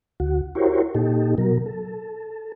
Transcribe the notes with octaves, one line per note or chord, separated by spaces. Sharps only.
D2 F#4
E4 F#4 G4 A#4 C5 C#5
A#2 D#4 G4 A4
B2 F#3 A#4
A4